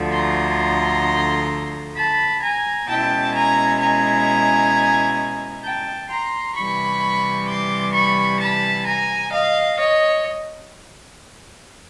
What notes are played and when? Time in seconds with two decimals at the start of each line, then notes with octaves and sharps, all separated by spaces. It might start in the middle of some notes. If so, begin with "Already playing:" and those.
Already playing: D2 D3 F3 A3
0.12 A#5 C6
1.96 A5 B5
2.42 G#5 A#5
2.88 B2 G#3 C#4 E4 G5 A5
3.34 G#5 A#5
3.80 G#5 A#5
5.64 G5 A5
6.10 A#5 C6
6.56 C3 E3 G3 B5 C#6
7.47 C6 D6
7.94 B5 C#6
8.40 A5 B5
8.86 G#5 A#5
9.32 D#5 F5
9.78 C#5 D#5